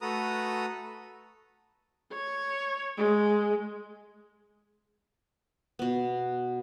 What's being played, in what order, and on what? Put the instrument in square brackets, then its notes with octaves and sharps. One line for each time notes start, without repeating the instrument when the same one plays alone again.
[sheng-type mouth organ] A3 F#4 A4 B4 A#5 D#6
[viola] C#5
G#3
[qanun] B2 B3